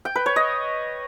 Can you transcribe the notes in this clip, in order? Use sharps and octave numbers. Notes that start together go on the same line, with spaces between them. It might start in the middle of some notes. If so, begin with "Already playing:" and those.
G5
B4
C#5
D#5